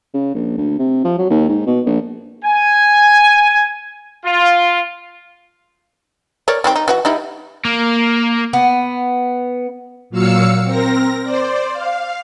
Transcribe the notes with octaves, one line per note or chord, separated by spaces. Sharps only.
C#3
A#1
D2
C3
F3
F#3
D#2
G#2
B2
A#1
G#5
F4
A#4 C#5 D5
D#3 G3 C4
D#4
E3 F#4 F#5
G3 D#4 E4
A#3
B3
A#2 F#3 F5 E6 C#7
C4 A#4 A#6
C5 D5
F5